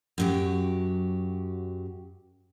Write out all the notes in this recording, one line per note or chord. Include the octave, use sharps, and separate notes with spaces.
F#2 F#3 G4